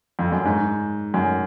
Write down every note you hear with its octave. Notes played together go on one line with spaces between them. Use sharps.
F2
F#2
G#2
F#2